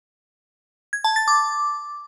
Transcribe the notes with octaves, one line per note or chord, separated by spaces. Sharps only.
G#6
A5
A6
D6